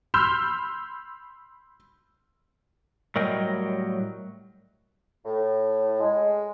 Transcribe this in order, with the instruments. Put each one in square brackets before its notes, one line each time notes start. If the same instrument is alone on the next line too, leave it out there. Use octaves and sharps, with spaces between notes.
[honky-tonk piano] B5 C6 E6 F6 G6
[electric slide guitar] A2 F#3 G3 A#4 D#5 G5
[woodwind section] A2
G#3